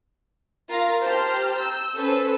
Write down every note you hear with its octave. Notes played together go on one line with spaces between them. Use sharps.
F4 A#4 F5 A#5
G4 C5 A5 A#5 C6 F6
E6 G6
C#4 A4 B4 C5 E6